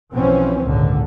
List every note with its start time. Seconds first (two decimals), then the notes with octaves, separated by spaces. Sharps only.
0.12 B1 B2 E3 F3 C4 C#4
0.64 G#1 C#2 A#2 D3